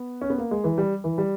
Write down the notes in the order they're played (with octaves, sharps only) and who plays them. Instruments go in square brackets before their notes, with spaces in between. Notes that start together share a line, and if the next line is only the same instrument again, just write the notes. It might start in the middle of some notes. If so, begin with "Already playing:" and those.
Already playing: [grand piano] B3
C#4
B3
A#3
G#3
E3
G3
E3
G3